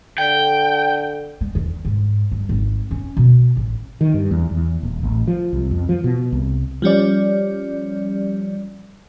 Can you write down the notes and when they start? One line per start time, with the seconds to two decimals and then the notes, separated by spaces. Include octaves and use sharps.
0.18 D3 G5
1.41 G#3
1.55 E2
1.85 G#2
2.32 G2
2.49 G#1
2.91 C#4
3.17 B2
3.57 A1
4.01 D#3
4.14 G2
4.31 E2
4.51 E2
4.83 D#1
5.03 A1
5.28 F3
5.53 C2
5.71 F2
5.89 F3
6.04 B2
6.32 C2
6.82 F3 G3 C#4 D5